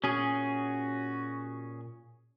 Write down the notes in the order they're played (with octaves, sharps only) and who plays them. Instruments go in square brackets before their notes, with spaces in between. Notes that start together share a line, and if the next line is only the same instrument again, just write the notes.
[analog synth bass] A#2 [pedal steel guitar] C#4 G#4 [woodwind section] F#4